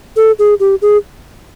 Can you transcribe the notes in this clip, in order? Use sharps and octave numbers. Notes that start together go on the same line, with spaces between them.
A4
G#4
G4
G#4